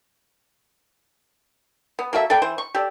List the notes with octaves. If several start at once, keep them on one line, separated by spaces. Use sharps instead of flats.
B3
A#3 F#4 A4 E5
A4 B4 D5 G5
E3 C5
C#6
G4 A4 D5